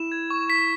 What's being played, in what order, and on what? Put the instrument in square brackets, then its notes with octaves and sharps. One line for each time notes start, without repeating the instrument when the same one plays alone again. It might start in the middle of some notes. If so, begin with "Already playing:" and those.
Already playing: [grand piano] E4 [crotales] E7
[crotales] G#6
C#6
B6